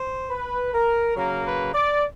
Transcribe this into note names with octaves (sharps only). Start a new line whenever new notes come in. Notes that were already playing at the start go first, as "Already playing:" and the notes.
Already playing: C5
B4
A#4
C#3 F#3 A#3 A#4
B4
D5